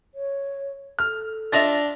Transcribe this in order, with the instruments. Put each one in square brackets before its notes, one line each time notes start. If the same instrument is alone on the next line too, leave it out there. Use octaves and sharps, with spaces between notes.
[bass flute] C#5
[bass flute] A4 [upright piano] F6
[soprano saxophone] D4 [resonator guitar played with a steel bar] F4 D#5 E5 [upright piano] A6 A#6 F7